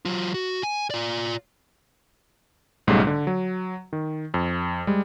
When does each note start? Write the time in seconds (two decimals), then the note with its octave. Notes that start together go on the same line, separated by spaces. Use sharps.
0.05 F#3 F4
0.34 F#4
0.63 G#5
0.91 F4 D5
2.87 B1 G#2 C#3 G3 A3
3.07 D3
3.27 F#3
3.93 D#3
4.34 F2
4.87 G3 G#3